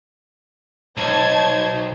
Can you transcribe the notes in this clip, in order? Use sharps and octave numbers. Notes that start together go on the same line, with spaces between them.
B1 C5 A5 G#6